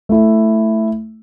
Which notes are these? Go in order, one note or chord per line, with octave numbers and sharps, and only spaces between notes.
A3 E4